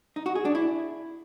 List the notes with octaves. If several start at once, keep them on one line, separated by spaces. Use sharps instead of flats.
D#4
F#4
G#4
D4
E4